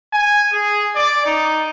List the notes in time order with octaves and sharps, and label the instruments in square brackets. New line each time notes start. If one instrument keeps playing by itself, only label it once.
[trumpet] G#5
G#4
D5
D#4